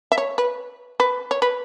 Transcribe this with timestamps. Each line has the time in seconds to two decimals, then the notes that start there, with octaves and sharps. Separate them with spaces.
0.12 E5
0.18 C#5
0.38 B4
1.00 B4
1.31 C#5
1.42 B4